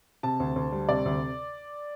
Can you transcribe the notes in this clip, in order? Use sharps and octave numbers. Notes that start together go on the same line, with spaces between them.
C3 A5
D2
D2
G3
C3 D5
D2